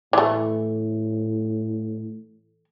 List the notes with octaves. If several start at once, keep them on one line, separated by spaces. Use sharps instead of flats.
A2 E3 A3